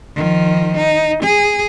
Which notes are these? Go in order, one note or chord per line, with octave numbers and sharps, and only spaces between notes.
D#3 F3
D#4
G#4